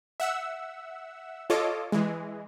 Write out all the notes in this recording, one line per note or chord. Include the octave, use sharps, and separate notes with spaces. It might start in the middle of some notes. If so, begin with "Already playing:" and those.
E5 F#5 E6
F4 A4 C#5 D#5 D6
E3 G#3